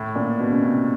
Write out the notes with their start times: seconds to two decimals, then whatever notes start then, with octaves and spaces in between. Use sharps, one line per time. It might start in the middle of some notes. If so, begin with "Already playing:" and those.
Already playing: A2
0.15 A#2
0.39 B2
0.51 C#3
0.63 C3